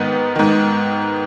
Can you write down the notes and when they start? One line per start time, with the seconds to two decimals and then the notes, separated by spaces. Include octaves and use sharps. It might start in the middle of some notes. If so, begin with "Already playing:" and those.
Already playing: G#2 D#3 B3
0.36 G#2 D#3